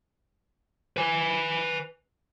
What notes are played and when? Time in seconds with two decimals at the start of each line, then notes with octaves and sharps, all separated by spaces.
0.97 B4 G#5